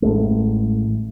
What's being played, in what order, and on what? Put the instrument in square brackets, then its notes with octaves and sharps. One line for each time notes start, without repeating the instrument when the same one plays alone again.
[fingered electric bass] A1 C#3 G#3 A3